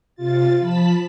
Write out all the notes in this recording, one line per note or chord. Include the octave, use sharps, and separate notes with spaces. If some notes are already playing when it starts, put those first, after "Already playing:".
C3 F4 A6
F3 A5 B5 B6